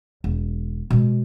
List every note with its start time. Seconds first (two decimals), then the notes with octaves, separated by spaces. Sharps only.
0.24 E1
0.90 B2 G#3